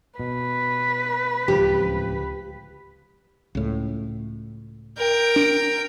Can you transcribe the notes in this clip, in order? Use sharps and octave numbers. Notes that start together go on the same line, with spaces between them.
B2 B4
D1 C#2 F3 G4
C#2 A2
A#4 G5
D4